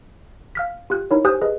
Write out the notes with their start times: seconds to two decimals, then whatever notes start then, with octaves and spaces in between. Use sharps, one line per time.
0.55 F5 F6 B6
0.90 F4 G4 F#6
1.11 D#4 E4 A#4 C#5
1.24 G4 C5 G#5 D#6 F#6 G6
1.41 G#4 B4 D#5